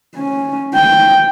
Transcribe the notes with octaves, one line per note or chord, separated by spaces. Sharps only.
C#4
G5